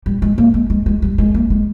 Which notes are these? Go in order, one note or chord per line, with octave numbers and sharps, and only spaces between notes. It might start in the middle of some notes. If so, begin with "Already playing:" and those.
G3
G#3
A#3
G#3
G#3
G#3
G3
G#3
A#3
G#3